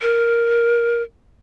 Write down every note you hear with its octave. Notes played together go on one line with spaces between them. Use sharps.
A#4